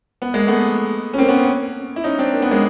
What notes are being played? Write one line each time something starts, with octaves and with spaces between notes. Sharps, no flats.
B3
G#3 A#3
A3 B3
C#4
A#3 C4
B3 C#4
E4
C#4 D#4
C4 D4
A#3
B3
G#3 A#3